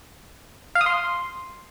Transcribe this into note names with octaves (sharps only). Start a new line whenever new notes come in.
F5
D#6
C6